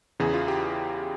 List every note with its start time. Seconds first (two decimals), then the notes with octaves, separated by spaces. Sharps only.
0.20 E2 C#3 E3 G#4
0.34 F4
0.48 G4